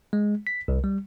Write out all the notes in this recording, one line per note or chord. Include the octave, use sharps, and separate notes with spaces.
G#3
B6
C2
G3